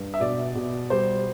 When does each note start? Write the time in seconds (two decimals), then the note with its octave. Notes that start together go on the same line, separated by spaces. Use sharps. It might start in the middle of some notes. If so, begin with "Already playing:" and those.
Already playing: G2
0.14 E5
0.20 B2 D5
0.55 B2
0.90 G3 C5